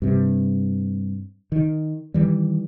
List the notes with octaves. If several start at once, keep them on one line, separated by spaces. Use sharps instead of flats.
G2 C3
D#3
D#3 E3 G3